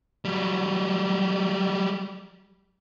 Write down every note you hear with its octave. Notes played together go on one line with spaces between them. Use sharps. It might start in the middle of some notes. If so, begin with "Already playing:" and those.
F#3 G3